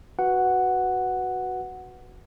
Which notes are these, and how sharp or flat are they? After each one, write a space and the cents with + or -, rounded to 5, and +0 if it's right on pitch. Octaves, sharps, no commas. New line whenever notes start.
F#4 +0 B4 +0 F#5 +0